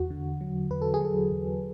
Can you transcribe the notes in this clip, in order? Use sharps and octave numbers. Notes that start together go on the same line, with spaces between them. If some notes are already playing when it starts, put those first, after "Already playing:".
Already playing: E2 F#4
D3
F#3
E2 B4
A4
G#4
F#3 A4
E2